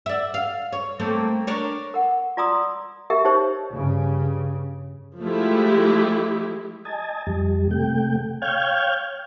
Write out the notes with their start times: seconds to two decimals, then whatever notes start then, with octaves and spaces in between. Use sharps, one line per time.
0.06 D5 E5
0.34 F5
0.73 C#5
1.00 A3 A#3 C4
1.47 D4 A#4 C#5
1.94 A#4 F#5
2.37 F4 D5 A#5 C6 D#6 E6
3.10 G4 A#4 D#5 E5
3.24 D#4 G4 C5 C#5
3.73 G2 C#3
5.22 F3 G#3 A3 E4 G4 G#4
6.85 D#5 G#5 A5
7.27 F2 G3
7.71 C3 A3 G5
8.42 C#5 F5 G5 F6 G6 G#6